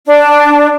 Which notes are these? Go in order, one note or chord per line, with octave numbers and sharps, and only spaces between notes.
D4